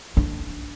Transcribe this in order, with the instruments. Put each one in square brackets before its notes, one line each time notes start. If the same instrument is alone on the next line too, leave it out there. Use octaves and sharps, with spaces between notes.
[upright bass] D4